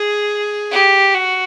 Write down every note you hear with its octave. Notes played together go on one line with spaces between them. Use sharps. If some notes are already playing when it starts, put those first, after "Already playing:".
Already playing: G#4
G4
F#4